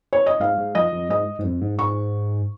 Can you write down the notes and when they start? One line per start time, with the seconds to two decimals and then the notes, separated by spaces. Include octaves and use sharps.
0.13 C#5
0.26 D#5
0.40 G#2 F5
0.58 G#2
0.75 F2 D#5
0.92 F2
1.09 G#2 D#5
1.39 G#2
1.44 F2
1.61 G#2
1.79 G#2 C#6